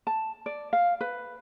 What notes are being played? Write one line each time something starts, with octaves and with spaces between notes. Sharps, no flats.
A5
D5
F5
B4